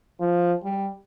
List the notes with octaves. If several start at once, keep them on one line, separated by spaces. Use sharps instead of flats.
F3
G3